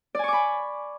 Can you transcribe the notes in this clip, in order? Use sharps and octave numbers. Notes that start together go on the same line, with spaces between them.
D5 G#5 B5 C#6 D6